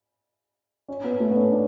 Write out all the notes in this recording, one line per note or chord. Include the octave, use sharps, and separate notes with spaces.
C#4
B3
A3
B3
C#4
D4